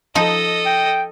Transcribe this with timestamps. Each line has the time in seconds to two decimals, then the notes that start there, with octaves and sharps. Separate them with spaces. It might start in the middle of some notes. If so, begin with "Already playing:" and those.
0.15 F3 D#4 A4 D#5
0.66 G5